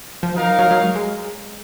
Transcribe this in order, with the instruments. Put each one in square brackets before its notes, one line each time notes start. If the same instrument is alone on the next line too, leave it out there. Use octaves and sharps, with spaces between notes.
[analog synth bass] F3
[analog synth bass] F#3 [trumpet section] D#4 A#4 F5
[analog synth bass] F3
F#3
F#3
G#3
G#3